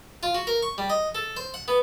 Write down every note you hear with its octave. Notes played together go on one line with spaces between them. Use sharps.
F4
F#4
A#4
C#6
G3
D#5
A4
C5
F#5
B3